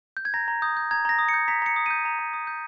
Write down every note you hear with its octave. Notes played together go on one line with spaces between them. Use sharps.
G6
G#6
A#5 A#6
A#5
D#6 G6
G6
A#5 G#6
A#5 A#6
D#6
C#7
G6
A#5 B6
A#5 C#7
D#6
G6 D#7
A#5
A#5
D#6
G6